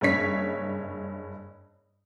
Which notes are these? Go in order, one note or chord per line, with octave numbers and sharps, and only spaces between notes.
F#1 G2 C#5 B6